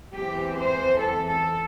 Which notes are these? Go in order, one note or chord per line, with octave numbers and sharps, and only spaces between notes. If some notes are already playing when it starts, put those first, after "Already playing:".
E2 E3 C4 G4
C5
A4
A4